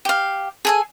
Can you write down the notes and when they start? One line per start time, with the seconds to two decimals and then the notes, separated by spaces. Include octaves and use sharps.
0.05 G4 F5
0.65 G#4 A4 G#5